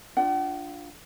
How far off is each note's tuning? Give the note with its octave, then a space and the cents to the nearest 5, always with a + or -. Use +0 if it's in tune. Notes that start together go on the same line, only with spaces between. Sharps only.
D4 +0 F4 +5 F#5 +45